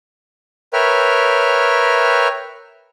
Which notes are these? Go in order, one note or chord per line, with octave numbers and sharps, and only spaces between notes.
A#4 B4 C#5 E5 G5 F6